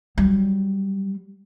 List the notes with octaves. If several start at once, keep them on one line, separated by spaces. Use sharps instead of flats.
F#3 G3